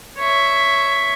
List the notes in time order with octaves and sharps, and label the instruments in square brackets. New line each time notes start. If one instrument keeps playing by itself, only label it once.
[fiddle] C#5 E5